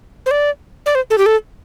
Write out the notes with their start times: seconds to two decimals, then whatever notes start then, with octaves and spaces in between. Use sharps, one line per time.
0.26 C5
0.31 D5
0.86 D5
0.95 C5
1.10 A4
1.18 G4
1.26 A4